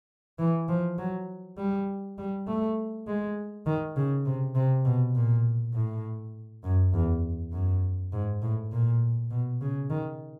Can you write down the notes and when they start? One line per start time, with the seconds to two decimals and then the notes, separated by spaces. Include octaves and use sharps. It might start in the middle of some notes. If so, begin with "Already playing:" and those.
0.39 E3
0.69 F3
0.98 F#3
1.58 G3
2.18 G3
2.47 A3
3.07 G#3
3.66 D#3
3.97 C#3
4.25 C3
4.55 C3
4.85 B2
5.15 A#2
5.74 A2
6.64 F#2
6.94 E2
7.52 F#2
8.13 G#2
8.42 A2
8.72 A#2
9.31 B2
9.61 C#3
9.90 D#3